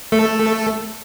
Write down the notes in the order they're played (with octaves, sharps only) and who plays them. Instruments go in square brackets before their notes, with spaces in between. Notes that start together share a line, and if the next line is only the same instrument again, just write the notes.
[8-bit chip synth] A3 A4